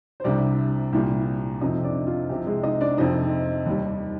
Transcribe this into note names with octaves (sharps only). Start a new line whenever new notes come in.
C5
C2 C3 G3 D4 D5
C2 A#2 G3
F2 C3 F3 D#4 D#5
D4 D5
F4
C2 C3 F3 G4
G#3 G#4
D#4 D#5
D4 D5
F2 C3 F3 D#4 D#5
D#2 D#3 G3